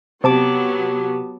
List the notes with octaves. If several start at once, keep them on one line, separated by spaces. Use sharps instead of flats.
C3 F#3 B3 G4 A5 D6